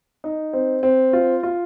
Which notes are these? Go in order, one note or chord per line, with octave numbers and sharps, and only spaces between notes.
D#4
C4
C4
F4
F4